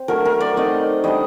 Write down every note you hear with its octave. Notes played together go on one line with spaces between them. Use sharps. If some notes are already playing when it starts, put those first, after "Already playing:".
Already playing: C4
F#3 A3 D4 A#4
A#4
D5
A3 C4 D#4 D#5
G3 D4 D#5